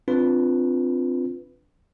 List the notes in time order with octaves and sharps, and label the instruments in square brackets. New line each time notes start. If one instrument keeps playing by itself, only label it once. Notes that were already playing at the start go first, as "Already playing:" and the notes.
[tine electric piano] C4 D4 F4 B4